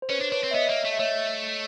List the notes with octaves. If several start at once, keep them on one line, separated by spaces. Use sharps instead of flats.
C5
C#4 B4 C#5
D4
D4 B4 C#5
C4
E5
B3 C#5 D#5
A#3
A3
E5
A3 C#5 D#5